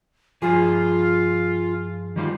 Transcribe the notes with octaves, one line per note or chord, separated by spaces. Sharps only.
G2 F3 F4 G#4
D#3 G3 F4